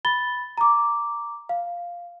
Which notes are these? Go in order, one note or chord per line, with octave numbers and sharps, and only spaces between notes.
B5 A6 G7
A#5 D6
F5